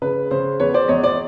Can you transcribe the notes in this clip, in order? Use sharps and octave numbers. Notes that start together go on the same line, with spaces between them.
C#3 B4
C#3 C5
E2 B4 C#5
C5 D5
E2 C#5 D#5
C5 D5